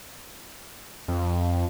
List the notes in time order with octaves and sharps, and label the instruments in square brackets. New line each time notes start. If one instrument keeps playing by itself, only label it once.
[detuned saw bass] F2